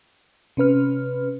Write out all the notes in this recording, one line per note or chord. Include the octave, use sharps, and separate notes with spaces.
C3 C#4 B4 F6